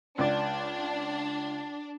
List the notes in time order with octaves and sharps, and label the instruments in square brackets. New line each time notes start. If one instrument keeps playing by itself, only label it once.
[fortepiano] C#2 D5 [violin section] D4